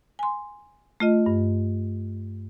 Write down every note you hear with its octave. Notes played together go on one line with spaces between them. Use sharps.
G#5 C6
A3 F4 D#5
G2